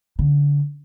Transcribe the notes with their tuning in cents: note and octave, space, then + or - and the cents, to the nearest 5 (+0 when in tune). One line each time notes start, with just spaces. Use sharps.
D3 -30